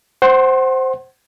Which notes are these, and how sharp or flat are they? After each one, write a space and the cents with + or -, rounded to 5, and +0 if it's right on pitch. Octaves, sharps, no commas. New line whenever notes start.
C5 +0 F#5 +25 C6 +35